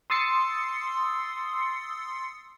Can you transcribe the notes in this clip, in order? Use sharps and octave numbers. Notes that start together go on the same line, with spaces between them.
C6 D#6 E6 A6 C7 C#7